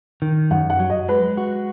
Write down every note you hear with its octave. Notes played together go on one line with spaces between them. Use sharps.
D#3
F#2 F#5
F#5
F#3
D#5
G#3 B4
F#4